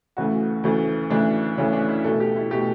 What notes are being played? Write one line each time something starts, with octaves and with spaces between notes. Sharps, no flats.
D2 C#3 E3 A3 F#4
D2 C#3 E3 A3
D2 C#3 E3 A3 D4
D2 C#3 E3 A3 C#4
D4
E4
B2 A3 A4
G4
E4
B2 A3 G4